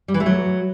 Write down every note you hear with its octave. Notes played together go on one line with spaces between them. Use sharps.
G3
E3
A3
F#3